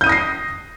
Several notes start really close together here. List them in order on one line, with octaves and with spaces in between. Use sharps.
G6 D#7 D#6 A#6 C7